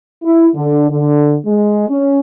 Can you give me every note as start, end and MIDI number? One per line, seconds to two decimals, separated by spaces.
0.24 0.47 64
0.55 0.88 50
0.89 1.35 50
1.46 1.87 56
1.88 2.19 61